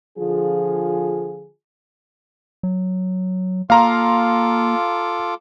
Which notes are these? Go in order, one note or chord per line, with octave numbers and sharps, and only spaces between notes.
D3 F3 F4 G#4
F#3
A#3 F4 A4 F5 A#5 C6 D6